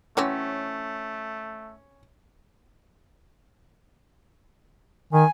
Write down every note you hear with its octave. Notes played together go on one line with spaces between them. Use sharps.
E3 F#3 A3 C4 C#4
D#3 G#5